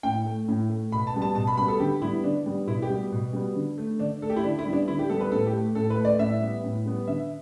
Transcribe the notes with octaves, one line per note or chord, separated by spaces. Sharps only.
A2 G5
A3
A2
A3
B2 B5
A5
G3 B3
A5
B2 A5
B5
G3 B3 B5
A4
D3 G4
G3 B3 E4
D3 D4
G3 B3
B2 E4
G4
G3 B3
B2
G3 B3
D3
A3
D3 D4
A3 A4
G4
E4
D3 D4
E4
G3 B3
D4
D3 E4
G4
G3 B3 A4
B4
A2 A4
G4
A3
A2 A4
B4
A3
D5
A2 E5
G3 B3
A2
G3 B3
D3 E5